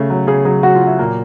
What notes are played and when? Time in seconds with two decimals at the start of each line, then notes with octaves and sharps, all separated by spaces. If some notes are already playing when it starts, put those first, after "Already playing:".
Already playing: C#3 A3
0.10 F#3
0.27 C#3 G#4
0.45 F#3 G#4
0.63 F#3 F#4
0.75 F4
0.82 F#3
0.87 E4
0.99 A#2 A#3